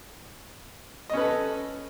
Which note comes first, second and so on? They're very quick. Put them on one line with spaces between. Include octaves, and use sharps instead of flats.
D#5 C#4 B4 A4